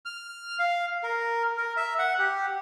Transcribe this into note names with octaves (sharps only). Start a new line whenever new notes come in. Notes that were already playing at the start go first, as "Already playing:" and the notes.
F6
F5
A#4
A#4
E5
F#5
G4